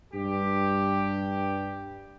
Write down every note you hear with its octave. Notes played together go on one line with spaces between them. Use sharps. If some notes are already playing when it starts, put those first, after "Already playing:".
G2 G4